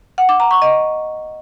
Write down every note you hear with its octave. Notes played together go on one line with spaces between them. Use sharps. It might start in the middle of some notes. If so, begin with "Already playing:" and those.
F#5
D6
A#5
C#6
D#5